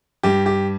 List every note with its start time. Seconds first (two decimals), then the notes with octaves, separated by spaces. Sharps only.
0.23 G2 G4
0.46 G4